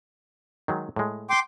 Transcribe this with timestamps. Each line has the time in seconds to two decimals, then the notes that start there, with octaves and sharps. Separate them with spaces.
0.68 D#3 F#3 G#3
0.96 A2 G#3
1.30 G5 C6 D6